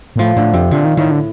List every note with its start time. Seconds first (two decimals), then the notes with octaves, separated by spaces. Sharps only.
0.16 A#2
0.19 A2 F3
0.36 A2 D3
0.54 F2 C3
0.71 A#2 D3
0.85 D#3
0.97 A2 D#3
1.11 D3